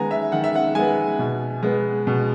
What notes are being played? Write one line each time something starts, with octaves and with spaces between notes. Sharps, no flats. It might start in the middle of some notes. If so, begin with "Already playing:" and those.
Already playing: D#3 G#3 B3 G#5 A#5
E5
D#3 F#5
E5
F#5
G#3 B3 G#5
B2
G#3 B3
B2